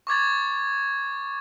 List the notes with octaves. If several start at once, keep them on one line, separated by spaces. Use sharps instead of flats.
C#6 D6 G#6 A6